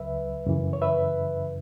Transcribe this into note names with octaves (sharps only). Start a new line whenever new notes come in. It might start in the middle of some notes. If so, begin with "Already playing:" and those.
Already playing: C#2 C#3 F#3 B4 E5
F#2 C#3 E3
C#5
B4 E5